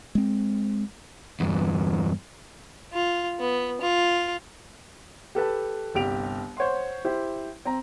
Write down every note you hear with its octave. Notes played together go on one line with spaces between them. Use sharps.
G#3 C4
E2 G2
F4
B3
F4
G4 A4 B4 A5
G1 C2 G4 D7 F7
C5 C#5 F#5 C6
E4 G4 C5
C4 A#5